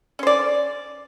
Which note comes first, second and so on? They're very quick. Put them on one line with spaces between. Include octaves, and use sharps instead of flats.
C#4 C5 D5